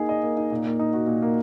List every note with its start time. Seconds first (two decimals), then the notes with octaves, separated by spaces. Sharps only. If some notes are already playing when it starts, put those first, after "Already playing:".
Already playing: A#3 D#4 G#4
0.09 D#5
0.23 A#3
0.37 D#4
0.51 A#2
0.66 A#3
0.79 D#4
0.93 F#4
1.07 A#2
1.22 A#3